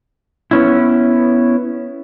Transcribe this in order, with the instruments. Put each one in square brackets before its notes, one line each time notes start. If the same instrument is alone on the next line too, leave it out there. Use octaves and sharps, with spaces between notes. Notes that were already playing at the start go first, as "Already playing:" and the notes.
[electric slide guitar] B3 C#4 E4